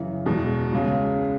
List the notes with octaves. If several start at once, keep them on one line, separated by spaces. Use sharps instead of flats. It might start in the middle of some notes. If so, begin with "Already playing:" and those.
Already playing: F#2 C#3 E3
E2 B2 G#3
C#2 C#3 G#3